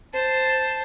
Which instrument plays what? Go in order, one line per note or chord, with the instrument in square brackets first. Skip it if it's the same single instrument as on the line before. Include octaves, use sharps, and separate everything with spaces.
[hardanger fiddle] C5 A5